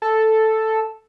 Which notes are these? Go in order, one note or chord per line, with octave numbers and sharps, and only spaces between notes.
A4